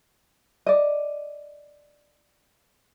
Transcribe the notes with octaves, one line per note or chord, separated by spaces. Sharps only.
D5 D#5